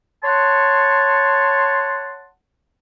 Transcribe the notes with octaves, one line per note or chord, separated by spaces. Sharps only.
C#5 F#5 A5 C6